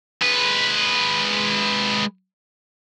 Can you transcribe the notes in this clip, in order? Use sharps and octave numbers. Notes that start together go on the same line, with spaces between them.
G#3 B4